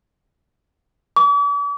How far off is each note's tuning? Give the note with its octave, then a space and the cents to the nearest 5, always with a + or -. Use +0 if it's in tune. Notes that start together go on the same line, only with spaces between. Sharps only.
D6 -45